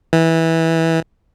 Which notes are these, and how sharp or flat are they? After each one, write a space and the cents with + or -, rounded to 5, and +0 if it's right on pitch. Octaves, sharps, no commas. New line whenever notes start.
E3 -15